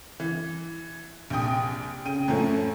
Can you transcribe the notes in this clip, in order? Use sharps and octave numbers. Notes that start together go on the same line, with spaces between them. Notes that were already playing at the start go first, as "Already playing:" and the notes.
E3
A#1 C3 G5 D#6
C#3 G5 D#7
F#2 A2 F3 A3 C#4